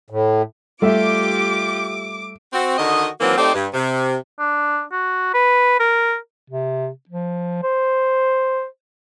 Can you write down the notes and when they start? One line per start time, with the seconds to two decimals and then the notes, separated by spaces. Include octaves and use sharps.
0.10 A2
0.82 G3 A3 F4 G4 E5 D6
2.53 C4 F#4
2.78 D3 D#3 F#4 D#5
3.21 D#3 E3 F#3 A#3 C4
3.38 A3 C4 D#4 G4 C5 D5
3.54 G2
3.74 C3
4.40 D4
4.92 F#4
5.34 B4
5.80 A#4
6.50 C3
7.09 F3
7.63 C5